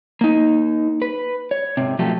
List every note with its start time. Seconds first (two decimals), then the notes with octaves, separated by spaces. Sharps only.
0.21 A#3 D#4
1.02 B4
1.51 C#5
1.77 G#2 C3
1.99 B2 F3 F#3 A3 G4 A4